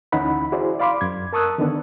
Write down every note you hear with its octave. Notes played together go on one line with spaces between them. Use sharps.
D2 E3 C#4 D#4 F#5 B5
E4 F#4 G#4 C5 D5
D5 F5 B5 C6 D6
F#2 G#6
A#4 A5 C#6 D#6 E6 F#6
D3 D#3 B3 D4